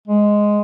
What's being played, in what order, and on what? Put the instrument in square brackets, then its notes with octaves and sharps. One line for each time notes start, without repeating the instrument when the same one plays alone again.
[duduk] G#3